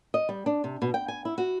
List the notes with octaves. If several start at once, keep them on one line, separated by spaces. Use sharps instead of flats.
D#5
G3
D4
C3
B2
G5
G#5
E4
F#4